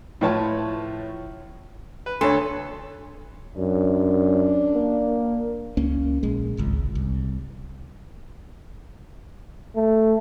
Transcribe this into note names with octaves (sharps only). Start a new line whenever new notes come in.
A2 F3 B4 C#5 A5 B5
B4
D2 A4 C#5 B5 C6
F#2 D4
A#3
C#2 A#3 C#4
A#1 G#3
D1 G#1 C#2
C2
A3